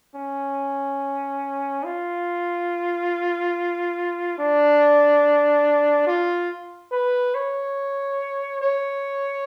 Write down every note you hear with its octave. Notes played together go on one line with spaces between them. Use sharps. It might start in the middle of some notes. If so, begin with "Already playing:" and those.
C#4
F4
D4
F4
B4
C#5
C#5